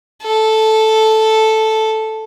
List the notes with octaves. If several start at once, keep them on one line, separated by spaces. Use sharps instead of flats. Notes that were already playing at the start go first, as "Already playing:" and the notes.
A4